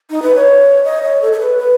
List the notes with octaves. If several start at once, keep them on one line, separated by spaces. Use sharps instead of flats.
D#4
B4
C#5
D#5
C#5
A4
A4
B4
B4